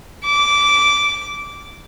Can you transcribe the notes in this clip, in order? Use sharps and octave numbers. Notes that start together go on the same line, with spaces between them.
D6